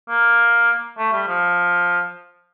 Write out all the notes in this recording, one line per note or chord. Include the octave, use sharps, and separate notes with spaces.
A#3
A3
G3
F3